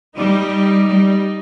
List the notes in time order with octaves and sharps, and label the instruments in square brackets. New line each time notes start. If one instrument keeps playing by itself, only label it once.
[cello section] G3 [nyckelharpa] D#4
[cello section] G3